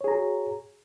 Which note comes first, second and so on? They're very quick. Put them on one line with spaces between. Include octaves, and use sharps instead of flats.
C#5 G#4 A#5 F#4